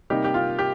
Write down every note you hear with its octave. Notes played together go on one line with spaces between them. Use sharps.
C3 G3 A#3 D#4 G4
G4
F4
G4